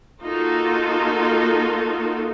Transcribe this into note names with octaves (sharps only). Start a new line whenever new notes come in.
A#3 D#4 F4 F#4 A4